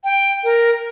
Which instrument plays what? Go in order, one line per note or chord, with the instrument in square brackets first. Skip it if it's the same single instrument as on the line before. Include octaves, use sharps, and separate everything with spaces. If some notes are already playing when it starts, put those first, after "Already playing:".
[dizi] G5
A#4